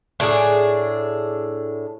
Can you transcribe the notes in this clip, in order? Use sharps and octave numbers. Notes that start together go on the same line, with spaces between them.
A2 D4 G#4